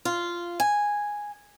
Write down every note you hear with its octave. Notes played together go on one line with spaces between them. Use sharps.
F4
G#5